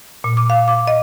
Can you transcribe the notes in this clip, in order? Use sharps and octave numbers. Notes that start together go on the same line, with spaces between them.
A#2
D6
F5
D6
D#5